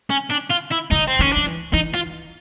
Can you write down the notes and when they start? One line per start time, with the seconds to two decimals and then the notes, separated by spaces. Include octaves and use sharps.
0.11 C#4
0.31 D4
0.51 F4
0.72 E4
0.91 D3 D#4
1.08 C4
1.19 D#3 C#4
1.32 F3 D4
1.46 E3
1.73 E3 D#4
1.94 F4